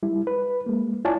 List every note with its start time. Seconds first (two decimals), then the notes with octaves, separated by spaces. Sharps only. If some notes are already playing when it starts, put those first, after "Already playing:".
0.03 G3 E4
0.27 B4
0.66 G#3 A#3
1.05 E4 F4 C#5 D5 G#5 A5